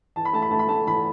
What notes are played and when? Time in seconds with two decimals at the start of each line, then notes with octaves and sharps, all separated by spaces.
0.16 E2 A5
0.25 B5
0.33 A3 A5
0.42 B5
0.50 A3 A5
0.59 B5
0.68 A3 A5
0.86 E2 B5